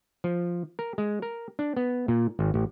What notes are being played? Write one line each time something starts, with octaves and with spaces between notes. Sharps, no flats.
F3
A#4
G#3
A#4
D4
B3
A#2
G#1
A1